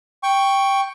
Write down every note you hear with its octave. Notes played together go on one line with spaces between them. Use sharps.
G5 C#6